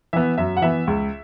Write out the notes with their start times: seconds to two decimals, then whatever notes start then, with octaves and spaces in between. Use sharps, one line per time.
0.13 E3 B3 E5
0.38 F#2 E5
0.57 F#5
0.62 E3 B3 E5
0.87 C#2